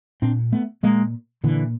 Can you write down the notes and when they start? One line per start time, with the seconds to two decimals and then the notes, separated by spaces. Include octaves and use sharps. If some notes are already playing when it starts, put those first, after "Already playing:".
0.22 A#2 C4 D4
0.52 A3 B3
0.83 A#2 G#3 A#3
1.44 A#2 D3 E3